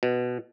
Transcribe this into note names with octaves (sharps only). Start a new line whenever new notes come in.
B2